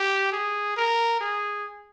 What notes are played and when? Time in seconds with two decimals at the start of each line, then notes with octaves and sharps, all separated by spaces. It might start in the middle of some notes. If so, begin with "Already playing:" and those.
Already playing: G4
0.32 G#4
0.77 A#4
1.20 G#4